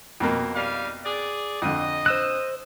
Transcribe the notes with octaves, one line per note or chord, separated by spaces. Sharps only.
F2 B2 A#3
G3 D#4 F5
G#4 D5
F2 D3 D#5
C5 E6 F#6